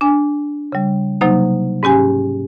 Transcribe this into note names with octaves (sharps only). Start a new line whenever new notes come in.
D4 G#5
C#3 G3
C3 F#3 A#3 D#4
G#2 C#4 G4 G#5